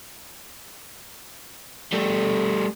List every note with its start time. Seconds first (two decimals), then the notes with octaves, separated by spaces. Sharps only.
1.93 G3 A3